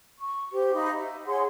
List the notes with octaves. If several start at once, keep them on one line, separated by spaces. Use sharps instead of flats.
C#6
G4 C5
D#4 F5 B5
E5
G#4 C#5 F#5 C6